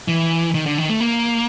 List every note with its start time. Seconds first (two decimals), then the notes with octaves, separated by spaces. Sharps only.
0.08 E3
0.55 D#3
0.66 D3
0.78 D#3
0.90 A3
1.01 A#3